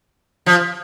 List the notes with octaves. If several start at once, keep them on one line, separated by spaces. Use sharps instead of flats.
F3